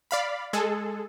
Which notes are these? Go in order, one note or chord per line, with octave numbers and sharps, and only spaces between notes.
D5 F5 B5
G#3 G#4 A4